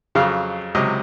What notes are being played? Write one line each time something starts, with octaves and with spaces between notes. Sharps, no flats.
F2 C#3 F#3 F5
C#2 C3 F#3 D#5